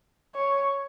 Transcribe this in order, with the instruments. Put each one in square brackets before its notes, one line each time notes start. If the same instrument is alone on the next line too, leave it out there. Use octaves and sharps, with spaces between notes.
[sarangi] C#5